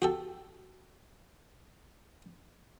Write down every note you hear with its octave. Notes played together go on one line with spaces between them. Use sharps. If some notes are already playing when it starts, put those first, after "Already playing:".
F#4 G4 A4